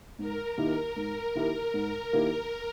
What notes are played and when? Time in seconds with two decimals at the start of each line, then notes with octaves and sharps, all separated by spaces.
0.19 G#2 A#4
0.57 D#3 A#3 E4 G4
0.96 G#2 A#4
1.35 D#3 A#3 E4 G4
1.74 G#2 A#4
2.12 D#3 A#3 E4 G4 A#4